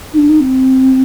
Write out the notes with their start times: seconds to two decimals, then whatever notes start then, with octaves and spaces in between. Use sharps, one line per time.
0.14 D#4
0.18 D4
0.29 D#4
0.40 C4